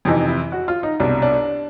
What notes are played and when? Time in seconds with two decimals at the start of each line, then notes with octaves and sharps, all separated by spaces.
0.05 F2 C3 E3 D#4
0.28 E4
0.52 F#4
0.68 F4
0.83 D#4
1.00 C2 B2 D4
1.22 D4